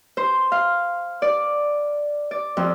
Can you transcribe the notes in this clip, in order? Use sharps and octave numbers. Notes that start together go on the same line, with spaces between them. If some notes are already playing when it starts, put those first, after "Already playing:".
C5
F5
D5
D5
F2